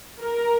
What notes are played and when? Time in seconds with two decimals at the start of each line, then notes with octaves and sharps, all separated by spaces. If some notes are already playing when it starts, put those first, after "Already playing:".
0.21 A#4